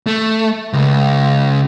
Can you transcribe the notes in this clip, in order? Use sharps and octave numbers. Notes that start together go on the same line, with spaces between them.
A3
C#2